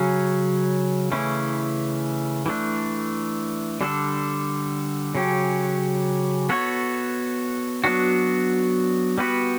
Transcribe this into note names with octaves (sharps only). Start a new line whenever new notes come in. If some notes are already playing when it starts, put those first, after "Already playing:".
Already playing: C#3 F#3 C#4
C#3 E3 A3 C#4 E4
E3 A3 D4
D3 G3 D4 A4
C#3 F#3 C#4 G4
B3 F#4 A4 C#5
F#3 B3 D4 F#4
G3 B3 F#4 B4